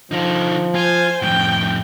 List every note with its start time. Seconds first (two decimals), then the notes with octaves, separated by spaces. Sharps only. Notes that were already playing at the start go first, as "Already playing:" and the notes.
0.11 D3 F3 D#4
0.75 F4 C5 G#5
1.22 F2 A2 G5